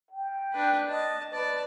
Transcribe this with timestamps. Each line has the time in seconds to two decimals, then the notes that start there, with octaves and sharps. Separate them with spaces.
0.11 G5
0.53 D4 B4
0.90 D#5 A5
1.34 B4 D5 A5